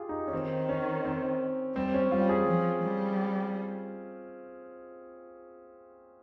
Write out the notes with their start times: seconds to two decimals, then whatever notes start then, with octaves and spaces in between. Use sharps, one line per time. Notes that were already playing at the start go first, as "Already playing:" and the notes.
Already playing: F4 G4 G#4
0.09 D#4
0.28 C#4
0.32 D#3 C4
0.69 C#4
1.05 C4
1.75 G3 C4
1.94 C#4
2.11 G3 F4
2.29 G#4
2.48 F3
2.83 G3